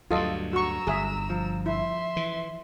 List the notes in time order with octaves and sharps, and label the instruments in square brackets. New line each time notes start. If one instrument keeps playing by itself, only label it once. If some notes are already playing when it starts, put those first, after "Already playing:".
[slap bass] D2 G2 [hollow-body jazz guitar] F#3 [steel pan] F4 A4 D#5
[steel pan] F#4 C#6 [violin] A#5 E6
[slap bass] G1 [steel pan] G#4 E5
[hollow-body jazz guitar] F3
[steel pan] E4 [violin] E5 C6
[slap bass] E3